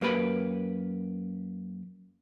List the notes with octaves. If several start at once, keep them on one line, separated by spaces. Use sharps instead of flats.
F#2 A#3 G4 B4 B5